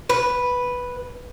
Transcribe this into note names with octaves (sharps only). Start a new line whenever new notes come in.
B4